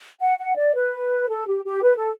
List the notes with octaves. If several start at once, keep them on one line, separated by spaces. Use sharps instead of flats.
F#5
F#5
D5
B4
A4
G4
G4
B4
A4